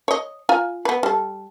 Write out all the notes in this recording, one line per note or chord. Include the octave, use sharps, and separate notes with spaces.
C#5 D#5
F4 G#5 A#5
B3 B4
G3 A4